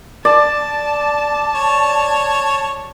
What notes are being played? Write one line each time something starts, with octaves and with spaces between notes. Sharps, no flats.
D5 A5
C#5